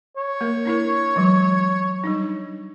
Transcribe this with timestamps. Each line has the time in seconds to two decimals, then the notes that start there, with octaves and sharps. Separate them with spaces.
0.17 C#5
0.41 A#3 A#4 E5
0.65 D4 E4 A#4
1.16 E3 F#3 G#3
2.04 G3 D4 D#4